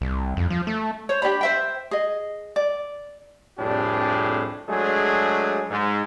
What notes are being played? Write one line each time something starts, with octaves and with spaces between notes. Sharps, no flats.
C2
F2
F3
A3
C5 C#5
D4 G4 D5 B5
C5 E5 G5
G#4 D#5
D5
C2 F2 A2 D4 G4 G#4
F#3 G#3 A3 D4 G#4
G#2 G#3